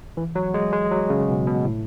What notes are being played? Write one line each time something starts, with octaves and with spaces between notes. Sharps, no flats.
E3
F#3
G#3
G#3
F#3
C#3
B2
B2
A2